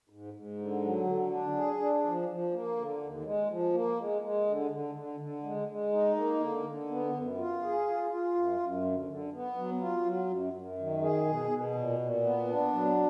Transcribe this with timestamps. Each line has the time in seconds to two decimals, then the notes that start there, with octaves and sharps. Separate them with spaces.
0.10 G#2
0.34 G#2
0.59 D3
0.82 F#3
1.07 D3
1.30 D4
1.56 G#4
1.79 D4
2.04 F3
2.29 F3
2.53 A#3
2.77 D3
3.00 D#2
3.25 G#3
3.50 F3
3.73 A#3
3.98 G#3
4.22 G#3
4.46 D3
4.71 D3
4.95 D3
5.20 D3
5.43 G#3
5.68 G#3
5.92 D#4
6.17 A#3
6.40 D3
6.66 D3
6.90 B3
7.14 F#2
7.37 F4
7.63 G#4
7.87 F4
8.10 F4
8.35 F#2
8.60 F#2
8.84 D2
9.08 D3
9.33 B3
9.57 F#3
9.80 F4
10.04 F#3
10.30 F#2
10.53 F#2
10.78 D#3
11.02 G#4
11.27 B2
11.51 B2
11.75 A#2
11.99 A#2
12.23 B3
12.48 D4
12.72 F#3